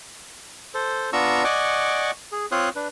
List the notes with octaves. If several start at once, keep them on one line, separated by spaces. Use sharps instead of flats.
A4 C5
B3 D4 F4 A#5 C#6 E6
D5 D#5 F#5 G#5 C#6 D6
G#4
C4 F4 C#5 C6 D#6 F#6
D4 B4